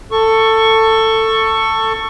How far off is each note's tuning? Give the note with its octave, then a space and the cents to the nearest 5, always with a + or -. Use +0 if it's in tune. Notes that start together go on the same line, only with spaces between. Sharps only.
A4 +15 C#6 +0